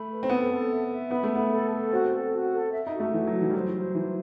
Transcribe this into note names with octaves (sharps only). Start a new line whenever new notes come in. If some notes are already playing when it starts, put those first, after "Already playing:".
Already playing: A3 B5
B4
C4
B3 A4
A4
E5
E5
B3 B5
A3
B5
B3
A4
A4
C4 F#4
A4
F#4
A4
E5
D#4
F#4
A3
E3 F#4
F#3
F#4
E3
G3
F#3 C5
C5
E3 C5